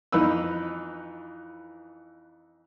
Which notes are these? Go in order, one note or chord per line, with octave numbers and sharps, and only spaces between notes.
F2 E3 D#4 B4 E6